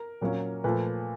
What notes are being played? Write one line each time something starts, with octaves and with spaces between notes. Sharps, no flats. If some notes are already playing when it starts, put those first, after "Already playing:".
Already playing: A#4
A#2 F#3 A#3 C#4
A#2 F3 A3 B4